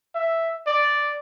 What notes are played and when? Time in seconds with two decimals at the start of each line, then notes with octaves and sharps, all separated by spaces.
0.15 E5
0.67 D5